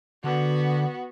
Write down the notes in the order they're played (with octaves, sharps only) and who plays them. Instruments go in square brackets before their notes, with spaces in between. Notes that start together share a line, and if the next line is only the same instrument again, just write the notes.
[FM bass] D3 [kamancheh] B3 F#4